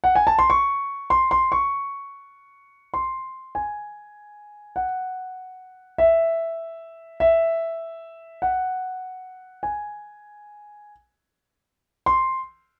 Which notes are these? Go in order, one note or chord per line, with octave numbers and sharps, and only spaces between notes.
F#5
G#5
A5
C6
C#6
C6
C6
C#6
C6
G#5
F#5
E5
E5
F#5
G#5
C6